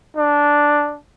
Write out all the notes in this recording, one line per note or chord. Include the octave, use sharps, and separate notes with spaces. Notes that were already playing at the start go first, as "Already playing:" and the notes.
D4